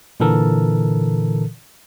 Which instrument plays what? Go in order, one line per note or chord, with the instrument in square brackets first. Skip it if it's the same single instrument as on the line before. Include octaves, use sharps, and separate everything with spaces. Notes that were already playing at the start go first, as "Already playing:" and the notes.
[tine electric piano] A#2 D3 E3 A4 A#4